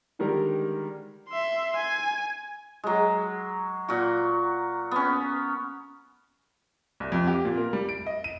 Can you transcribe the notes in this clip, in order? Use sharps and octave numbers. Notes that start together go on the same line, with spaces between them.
D3 D#3 G3 G#3 G4 A#4
E5 C6
G#5
F#3 G#3
A#2 F#4
B3 C#4
C2
F2
G4
A#2
A#4
G3
D7
D#5
D#7